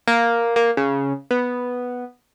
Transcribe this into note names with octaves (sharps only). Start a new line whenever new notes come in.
A#3
A#3
C#3
B3